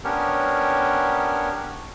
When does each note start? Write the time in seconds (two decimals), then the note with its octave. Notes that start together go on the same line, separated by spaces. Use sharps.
0.04 B3 C#4 D4 G4 A#4 C#5